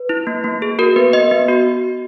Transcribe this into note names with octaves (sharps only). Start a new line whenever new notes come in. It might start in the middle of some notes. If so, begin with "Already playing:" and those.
Already playing: B4
E4
A#3
A#3
G#4
F#4 A#4
B3 B4
B3 D#5
B3
F#4